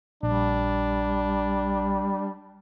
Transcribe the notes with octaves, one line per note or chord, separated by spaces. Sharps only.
A#1 G3 D4